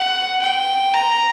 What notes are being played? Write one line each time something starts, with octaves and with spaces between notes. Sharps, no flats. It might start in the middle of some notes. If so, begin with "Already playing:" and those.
Already playing: F#5
G5
A#5